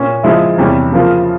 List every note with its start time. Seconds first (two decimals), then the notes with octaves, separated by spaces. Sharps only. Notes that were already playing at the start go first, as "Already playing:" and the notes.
Already playing: A#2 C#4
0.23 C#3 F3 G#3 E4
0.58 E2 C3 E3 G3 C#4
0.92 C#3 F3 A#3 F4